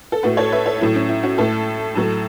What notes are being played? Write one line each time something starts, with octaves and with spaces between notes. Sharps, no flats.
A4
A2 A3 F#4 B4
A4 C#5
B4 E5
A4 C#5
A2 F#3 A3 E4
C#4
E4
C#4 F#4
A2 A3 E4 A4
A2 F#3 A3